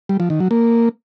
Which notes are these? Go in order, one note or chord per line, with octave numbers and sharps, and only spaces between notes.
G3
F3
D#3
F#3
A#3